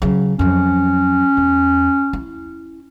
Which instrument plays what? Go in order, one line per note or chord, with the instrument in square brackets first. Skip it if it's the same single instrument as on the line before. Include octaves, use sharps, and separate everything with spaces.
[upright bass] C#3 F#3
[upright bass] F2 F#3 [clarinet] C#4
[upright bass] E2
E4